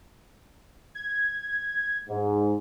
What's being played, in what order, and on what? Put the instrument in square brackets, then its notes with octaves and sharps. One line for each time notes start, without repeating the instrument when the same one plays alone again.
[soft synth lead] G#6
[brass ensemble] G#2